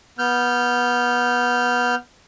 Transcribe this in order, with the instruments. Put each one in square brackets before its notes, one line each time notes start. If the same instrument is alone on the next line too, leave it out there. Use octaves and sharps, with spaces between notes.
[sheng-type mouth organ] B3 F6 G6